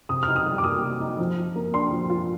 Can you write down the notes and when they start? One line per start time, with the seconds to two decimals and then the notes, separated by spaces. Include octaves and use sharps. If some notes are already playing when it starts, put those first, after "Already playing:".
0.09 C3 D#6
0.23 D#4 F6
0.36 D#6
0.46 G3
0.58 D6
0.64 A#3 D#6
0.83 C3
1.00 D#4
1.19 F3
1.37 F4
1.56 A#3
1.73 D4 C6
1.91 F3
2.10 F4